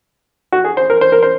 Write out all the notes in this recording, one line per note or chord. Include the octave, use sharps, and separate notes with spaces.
F#4
G#4
C5
A#4
C5
A#4
C5